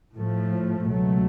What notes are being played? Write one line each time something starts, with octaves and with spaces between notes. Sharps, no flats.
A2 F3 A3
C#2 B2 F#3 A3